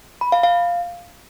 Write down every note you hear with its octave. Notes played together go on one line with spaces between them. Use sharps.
B5
F5
F5